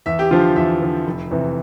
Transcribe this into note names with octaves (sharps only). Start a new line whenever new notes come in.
E2 E5
G4
D3 F3 F4
E2 E5
D3 F3
F1
E2 C3 E3